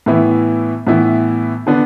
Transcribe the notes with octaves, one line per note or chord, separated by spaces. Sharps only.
A2 E3 B3 E4
A2 E3 B3 E4
D3 B3 D4